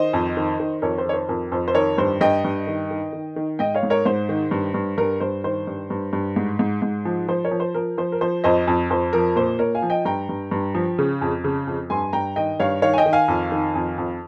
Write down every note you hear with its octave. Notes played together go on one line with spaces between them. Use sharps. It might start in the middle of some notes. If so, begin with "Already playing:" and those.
Already playing: D#3 C5 D#5
F2
D#3
D#3
F2 A#4 C#5
C5
D#3 C#5
C5
F2 A#4
F2 C5
C5
D#3 A#4 C#5
G2 C5
G2 D#5 G5
G2
D#3
D#3
D#3
D#3
G#2 D#5 G5
C#5 F5
G#2
A#4 C#5
G#2 C5
D#3
G2
G2
G2 A#4
G2 C5
D#3 C5
G2
G2
G2
G#2
G#2
G#2
F3
F3 C5
A#4 C#5
F3
C5
F3 A#4
F3 C5
A#4
F3 C5
F2 C5 D#5
F2
F2 C5
F3 A#4
A#2 C5
A#2 A#4 C#5
F5 G#5
F3
D#5 G5
G2 G5 A#5
G2
G2
F3
C#3
F2
C#3
F2
G2 G#5 C6
G2 G5 A#5
D#3 D#5 G5
G2 C#5 F5
D#3 C#5 F5
G#5
D#5 G5
D#3
F5 G#5
F2
D#3
F2
F2